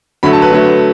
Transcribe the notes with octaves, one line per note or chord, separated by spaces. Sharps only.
D3 F#3 A3 B5
A5
B4
D3 F#3 A3